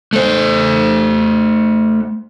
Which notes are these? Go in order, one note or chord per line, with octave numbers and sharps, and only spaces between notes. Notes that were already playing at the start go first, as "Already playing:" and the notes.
A3 C5